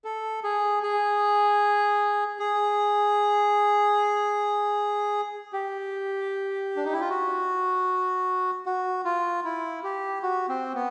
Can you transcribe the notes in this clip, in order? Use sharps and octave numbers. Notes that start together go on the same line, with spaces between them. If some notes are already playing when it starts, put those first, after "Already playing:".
A4
G#4
G#4
G#4
G4
D4
D#4
E4
F4
F#4
F#4
F4
E4
G4
F#4
C4
B3